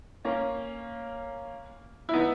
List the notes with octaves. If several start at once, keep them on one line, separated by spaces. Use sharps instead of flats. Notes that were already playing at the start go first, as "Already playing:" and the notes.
A#3 C#4
E4
B3 D#4